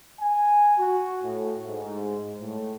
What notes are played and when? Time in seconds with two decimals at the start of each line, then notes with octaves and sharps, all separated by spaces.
0.20 G#5
0.78 F#4
1.24 A2
1.67 G#2
2.40 A2